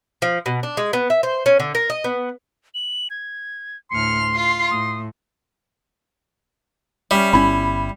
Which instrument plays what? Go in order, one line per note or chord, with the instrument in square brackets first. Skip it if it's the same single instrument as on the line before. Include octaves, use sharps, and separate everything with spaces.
[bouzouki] F3
B2
D4
G#3
B3
E5
C5
C#4
D3
A#4
D#5
B3
[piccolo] F#7
G#6
[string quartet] D2 A2 F6 [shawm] C6 [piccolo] C#7
[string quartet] F4 [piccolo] C7
[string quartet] A2 [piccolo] D#6
[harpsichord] G3 [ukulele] C#4 E5
[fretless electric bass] G1 C4 C#4 [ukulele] E4 B5